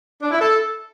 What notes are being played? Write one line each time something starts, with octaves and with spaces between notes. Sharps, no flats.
D4
E4
A4